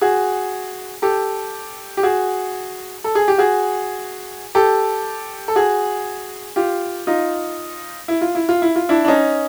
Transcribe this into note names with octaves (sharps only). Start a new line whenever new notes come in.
F#4 G#4
G4 A4
G4
F#4 G#4
A4
G#4
G4
F#4 G#4
G4 A4
A4
F#4 G#4
F4 G4
D#4 F4
E4
F4
E4
F4
E4
F4
D4 E4
D4
C#4 D#4